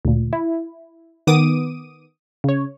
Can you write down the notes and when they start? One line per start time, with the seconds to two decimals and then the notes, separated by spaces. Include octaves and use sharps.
0.05 D2 A#2
0.33 E4
1.27 D#3 B3 D6 D#6 D#7
2.44 C#3 C#5